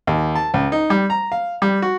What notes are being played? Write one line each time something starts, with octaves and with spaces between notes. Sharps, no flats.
D#2
A5
C#2
D#4
G3
A#5
F5
G3
F#4